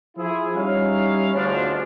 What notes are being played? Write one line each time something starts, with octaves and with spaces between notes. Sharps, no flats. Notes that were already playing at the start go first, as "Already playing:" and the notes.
F3 E4 G#4
G3 C#4 D#4 E4 C#5 F5
D2 G#2 B2 F3 C#4 D4